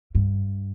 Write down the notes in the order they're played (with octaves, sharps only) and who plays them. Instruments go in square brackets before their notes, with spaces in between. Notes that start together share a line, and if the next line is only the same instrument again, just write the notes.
[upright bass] G2